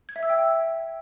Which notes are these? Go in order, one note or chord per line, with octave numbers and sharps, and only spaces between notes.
G#6
E5
E6
G5